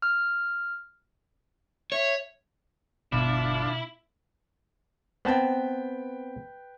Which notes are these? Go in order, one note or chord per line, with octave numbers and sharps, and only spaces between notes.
F6
C#5 E5
G1 B2 D3 D4 E4 F4
B3 C4 B4 G5 A5